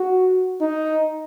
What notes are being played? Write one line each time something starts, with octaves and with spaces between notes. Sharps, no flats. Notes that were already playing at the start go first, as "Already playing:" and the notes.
Already playing: F#4
D#4